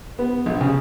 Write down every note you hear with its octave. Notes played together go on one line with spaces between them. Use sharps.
B3
A#1
C#3